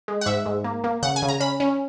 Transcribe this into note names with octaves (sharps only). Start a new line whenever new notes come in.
G#3
F#5
G#2 E5
G#2
A#3
A#3
C#3 F#5
G#5
C#3
A#5
C#4 B5
C#4